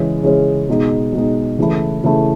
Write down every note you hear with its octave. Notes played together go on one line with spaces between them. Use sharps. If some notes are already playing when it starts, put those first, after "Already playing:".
Already playing: C#3 E3 G#3 C#4
C#3 E3 G#3 C#4
B2 G#3 D#4
B2 G#3 D#4
C#3 E3 A3 E4
C#3 E3 A3 E4